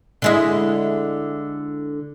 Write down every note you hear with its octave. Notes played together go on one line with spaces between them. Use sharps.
D3 G#3 E4